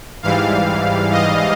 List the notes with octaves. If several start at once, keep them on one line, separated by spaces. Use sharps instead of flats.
G#2 E3 G3 F5
D#5